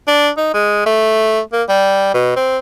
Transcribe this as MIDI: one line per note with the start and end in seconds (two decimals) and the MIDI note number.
0.08 0.29 62
0.37 0.51 63
0.54 0.84 56
0.86 1.40 57
1.53 1.63 58
1.69 2.12 55
2.14 2.35 47
2.36 2.58 60